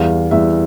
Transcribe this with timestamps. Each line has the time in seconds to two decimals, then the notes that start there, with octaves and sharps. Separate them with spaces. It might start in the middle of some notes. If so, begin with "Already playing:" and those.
Already playing: E2 E3 G3 F5
0.31 E2 E3 G3 E5